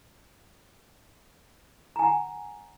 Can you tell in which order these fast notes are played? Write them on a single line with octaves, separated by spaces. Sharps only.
A#5 G#5 F#5